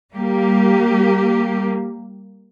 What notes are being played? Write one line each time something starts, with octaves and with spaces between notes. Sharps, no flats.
G3 A#3 G4